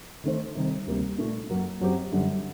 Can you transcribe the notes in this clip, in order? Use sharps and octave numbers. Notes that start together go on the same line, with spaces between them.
D#3 A3 D4 A4 C5
C3 D#3 G3
D2 C3 G3 A#3
A#2 A3 D4
F#2 F#3 A#3 F#4
F#2 F#3 C4 G4
F#2 D3 G3